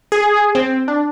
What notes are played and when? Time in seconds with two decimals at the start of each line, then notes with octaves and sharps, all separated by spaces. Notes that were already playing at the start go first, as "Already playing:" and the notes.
0.12 G#4
0.55 C4
0.88 D4